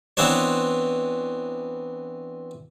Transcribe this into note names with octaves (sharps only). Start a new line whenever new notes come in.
E3 B3 C4 D4 C5 C#5